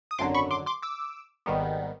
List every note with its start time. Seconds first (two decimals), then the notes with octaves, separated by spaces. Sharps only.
0.11 D#6
0.19 G#1 F#2 D3 F#3 C6 D6
0.34 B5 C#6
0.51 C6 D6
0.66 C6 D6
0.82 D6 E6
1.46 G#1 G#2 D#3 G3 B3